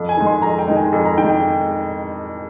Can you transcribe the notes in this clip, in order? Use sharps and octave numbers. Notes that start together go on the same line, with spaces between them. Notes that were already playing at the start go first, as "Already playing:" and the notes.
Already playing: F2
G#5
D#3 G#3
C6
F2 A#5
G5
D#3 G#3
G#5
F2
A#5
D#3 G#3 G5
G5